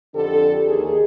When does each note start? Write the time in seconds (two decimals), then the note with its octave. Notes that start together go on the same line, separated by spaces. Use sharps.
0.15 F2 D3 D4 G4 A4
0.67 D#2 G#4